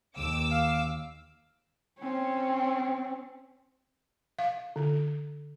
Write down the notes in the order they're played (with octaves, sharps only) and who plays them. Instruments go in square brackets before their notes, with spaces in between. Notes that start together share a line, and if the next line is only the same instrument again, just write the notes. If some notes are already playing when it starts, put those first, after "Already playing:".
[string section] D#2 D6 E6
[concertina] F5
[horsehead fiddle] C4 C#4
[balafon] F5
D3